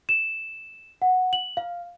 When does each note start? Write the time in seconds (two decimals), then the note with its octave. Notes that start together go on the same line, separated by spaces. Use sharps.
0.09 E7
1.02 F#5
1.33 F#7
1.57 F5